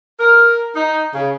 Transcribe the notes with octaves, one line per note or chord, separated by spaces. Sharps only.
A#4
D#4
C#3